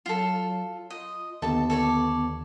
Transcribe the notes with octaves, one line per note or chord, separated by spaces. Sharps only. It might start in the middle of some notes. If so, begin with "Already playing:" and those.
F#3 F4 A4
F4 D#5
D#2 D3 B3 A4 A5
A4 C#5 D5